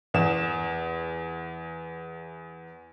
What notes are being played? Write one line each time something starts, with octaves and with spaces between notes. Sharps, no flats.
E2 E7